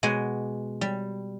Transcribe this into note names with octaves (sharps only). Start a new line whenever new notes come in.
B2 G#3 F#5 G#5
G3